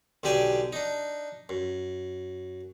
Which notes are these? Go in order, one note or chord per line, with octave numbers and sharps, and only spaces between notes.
B1 D3 G4 D5 G#5
D4 D#4
F#2